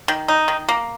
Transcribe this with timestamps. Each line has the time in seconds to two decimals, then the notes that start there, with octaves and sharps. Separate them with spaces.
0.08 D#3
0.28 D#4
0.48 D#3
0.69 A#3